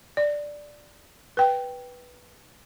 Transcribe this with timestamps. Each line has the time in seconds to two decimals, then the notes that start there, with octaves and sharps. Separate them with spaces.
0.17 D5
1.37 B4 G5